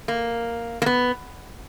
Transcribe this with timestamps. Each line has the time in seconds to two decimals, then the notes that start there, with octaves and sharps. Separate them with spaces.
0.08 A#3
0.82 A#3
0.86 B3